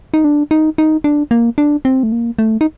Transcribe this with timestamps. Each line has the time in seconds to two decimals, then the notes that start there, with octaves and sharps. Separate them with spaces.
0.14 D#4
0.24 D4
0.51 D#4
0.78 D#4
1.04 D4
1.31 A#3
1.58 D4
1.85 C4
2.03 A3
2.12 A#3
2.39 A3
2.61 D#4